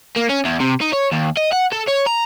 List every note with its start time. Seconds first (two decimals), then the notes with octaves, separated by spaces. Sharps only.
0.16 A#3
0.30 C#4
0.45 E2
0.60 C3
0.81 D#4
0.92 C#5
1.12 D#2
1.37 D#5
1.53 F#5
1.73 A4
1.88 C#5
2.07 A#5